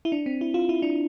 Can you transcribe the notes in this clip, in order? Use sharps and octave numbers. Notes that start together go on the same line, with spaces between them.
E4
D4
C4
E4
F4
E4
D4